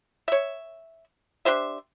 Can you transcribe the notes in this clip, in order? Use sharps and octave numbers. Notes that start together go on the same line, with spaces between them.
C#5 E5
D4 G4 C5 E5